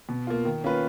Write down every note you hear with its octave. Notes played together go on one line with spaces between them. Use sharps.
B2
A#3 F4
D#3
A#3 C#4 F4 B4